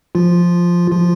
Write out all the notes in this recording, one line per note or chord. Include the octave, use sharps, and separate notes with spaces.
F3 F4
F3 F4